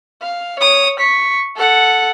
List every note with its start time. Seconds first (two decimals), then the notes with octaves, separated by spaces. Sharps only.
0.22 F5
0.60 C#5 D#6
0.99 C#6 B6
1.57 A4 F#5